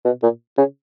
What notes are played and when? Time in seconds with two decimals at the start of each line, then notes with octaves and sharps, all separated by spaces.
0.05 B2
0.23 A#2
0.58 C#3